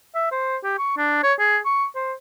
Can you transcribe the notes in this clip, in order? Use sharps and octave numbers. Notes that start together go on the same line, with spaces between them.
E5
C5
G4
C#6
D4
C#5
G#4
C#6
C5